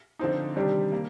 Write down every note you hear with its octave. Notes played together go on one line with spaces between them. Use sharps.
D3 F3 C4 D#4
C3 D#3 G3 D4 G4
A#3